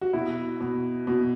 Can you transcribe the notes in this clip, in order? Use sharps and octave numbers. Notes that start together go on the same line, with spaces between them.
F#4
B2 E4
B2
B2